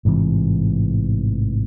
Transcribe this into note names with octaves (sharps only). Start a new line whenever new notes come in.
A1 G#2 C3 E3